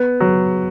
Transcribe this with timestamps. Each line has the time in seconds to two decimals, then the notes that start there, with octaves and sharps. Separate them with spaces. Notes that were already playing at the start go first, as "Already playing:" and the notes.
Already playing: B3
0.20 F#3